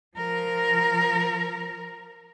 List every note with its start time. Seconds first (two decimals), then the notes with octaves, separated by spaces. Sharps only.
0.17 F3 A#4